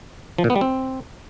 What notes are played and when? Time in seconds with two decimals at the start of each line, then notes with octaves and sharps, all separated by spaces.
0.38 F3
0.44 A#2
0.50 B3
0.56 G3
0.61 C4